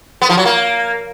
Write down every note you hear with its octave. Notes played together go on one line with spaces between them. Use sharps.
B3
F3
F#3
A#3